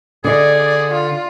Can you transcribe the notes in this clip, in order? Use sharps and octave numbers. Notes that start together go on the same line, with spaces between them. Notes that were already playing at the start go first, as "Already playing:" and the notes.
D3 G#4 D5 D#5
F4